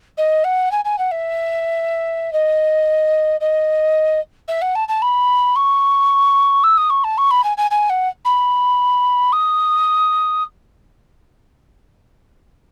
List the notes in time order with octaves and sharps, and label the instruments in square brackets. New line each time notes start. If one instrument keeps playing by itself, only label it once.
[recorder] D#5
F#5
G#5
G#5
F#5
E5
D#5
D#5
E5
F#5
A5
A5
B5
C#6
E6
D#6
C#6
A5
C#6
B5
G#5
G#5
G#5
F#5
B5
D#6